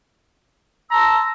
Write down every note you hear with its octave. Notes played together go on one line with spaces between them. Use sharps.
A5 A#5 C6 E6